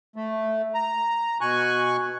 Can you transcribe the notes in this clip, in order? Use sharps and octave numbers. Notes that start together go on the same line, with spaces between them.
A3
A#5
B2 G#5 C#6 F#6